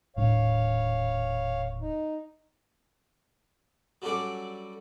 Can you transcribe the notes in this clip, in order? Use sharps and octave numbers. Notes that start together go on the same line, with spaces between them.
D#1 A2 D4 C#5 F5
D#4
F#3 G3 C#4 D4 A4 D5